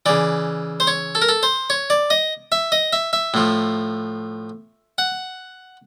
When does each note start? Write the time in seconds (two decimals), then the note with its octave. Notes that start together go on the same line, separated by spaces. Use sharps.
0.06 C#3 E3 D5
0.80 C5
0.87 C#5
1.15 A4
1.22 A#4
1.29 A4
1.43 C5
1.70 C#5
1.90 D5
2.10 D#5
2.52 E5
2.72 D#5
2.93 E5
3.13 E5
3.34 A2 F3
4.98 F#5